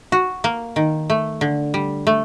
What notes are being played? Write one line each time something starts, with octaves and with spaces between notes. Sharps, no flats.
F#4
A#3
D#3
A3
D3
G3
A3